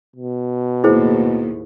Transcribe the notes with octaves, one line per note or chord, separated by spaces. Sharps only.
B2
D#2 A2 E4 G#4 C5